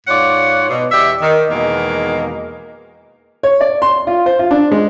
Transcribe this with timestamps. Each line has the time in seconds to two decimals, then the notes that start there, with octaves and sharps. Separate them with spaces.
0.07 G#2 F4 C#5 D5 F#5
0.69 B2
0.92 E2 G4 D5 E5
1.21 D#3
1.50 E2 B2 D#3 G#3 A#3
3.43 C#5
3.61 D5
3.82 C6
4.07 F4
4.26 C5
4.39 F4
4.51 D4
4.72 G#3